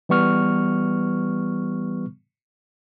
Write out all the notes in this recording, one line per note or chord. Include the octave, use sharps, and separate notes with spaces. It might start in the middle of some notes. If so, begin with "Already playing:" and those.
E3 G3 B3 C#6 F6